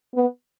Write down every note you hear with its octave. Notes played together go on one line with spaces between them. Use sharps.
B3